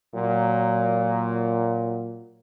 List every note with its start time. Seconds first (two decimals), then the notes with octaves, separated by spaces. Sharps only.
0.14 A#2 F#3